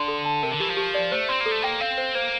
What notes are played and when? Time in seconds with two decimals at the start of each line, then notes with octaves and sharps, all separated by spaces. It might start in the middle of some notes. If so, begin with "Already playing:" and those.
Already playing: D3 D5 C6
0.08 A4
0.25 A5
0.43 C3 A#4
0.52 D3
0.60 E3 G4
0.69 F3
0.77 G4
0.94 D5
1.12 A3 C5
1.29 C4 C6
1.41 A#3
1.46 A4
1.52 A3
1.62 A#3 G5
1.80 C4 F5
1.98 C5
2.15 A#3 C5